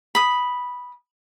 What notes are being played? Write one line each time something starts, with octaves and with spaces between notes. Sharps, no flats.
B5 D#6